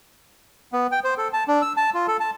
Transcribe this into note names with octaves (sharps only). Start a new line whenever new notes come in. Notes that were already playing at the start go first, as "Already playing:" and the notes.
B3
G5
C5
A4
A5
D4
E6
A5
F4
A4
A5